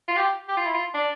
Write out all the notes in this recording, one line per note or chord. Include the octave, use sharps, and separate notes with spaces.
F4
G4
G4
F4
E4
F4
D4